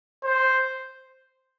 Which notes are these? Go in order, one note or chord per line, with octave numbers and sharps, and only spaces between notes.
C5